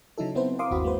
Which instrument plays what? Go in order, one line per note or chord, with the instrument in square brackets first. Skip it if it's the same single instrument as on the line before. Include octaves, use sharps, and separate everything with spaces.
[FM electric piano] C#3 F#3 D#4 E4 A4
F#3 B3 C4 E4 B4 C5
A#4 C5 F5 C6 D6 D#6
G1 D#2 C4 E4 F#4 B5
G#3 A#3 B4 C5